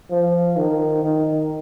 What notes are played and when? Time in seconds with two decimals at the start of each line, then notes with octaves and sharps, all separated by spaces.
0.10 F3
0.56 D#3
1.03 D#3